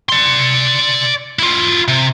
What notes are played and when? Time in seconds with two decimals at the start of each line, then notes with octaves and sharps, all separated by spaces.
0.10 D5 C6
1.39 E4 F4
1.88 C3